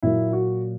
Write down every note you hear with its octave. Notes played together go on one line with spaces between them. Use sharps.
A#2 F#3 A#3 E4
F#4